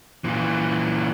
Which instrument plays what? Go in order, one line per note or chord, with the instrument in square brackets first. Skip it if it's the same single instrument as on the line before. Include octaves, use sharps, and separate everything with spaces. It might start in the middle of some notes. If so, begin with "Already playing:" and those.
[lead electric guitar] A#2 E3